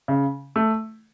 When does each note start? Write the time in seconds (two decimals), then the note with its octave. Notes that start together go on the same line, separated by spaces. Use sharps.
0.08 C#3
0.56 A3